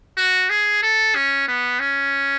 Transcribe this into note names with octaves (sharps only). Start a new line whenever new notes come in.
F#4
G#4
A4
C#4
B3
C#4